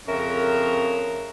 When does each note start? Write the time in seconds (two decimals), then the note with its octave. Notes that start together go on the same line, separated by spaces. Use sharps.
0.07 F2 C#3 C#4 A#4 E5